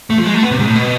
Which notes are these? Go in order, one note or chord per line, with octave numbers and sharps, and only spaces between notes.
A3
F3
G#3
A3
B3
C3
G#2
A2
B2